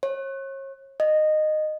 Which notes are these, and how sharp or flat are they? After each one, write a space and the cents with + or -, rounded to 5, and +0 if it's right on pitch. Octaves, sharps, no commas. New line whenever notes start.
C#5 -35
D#5 -15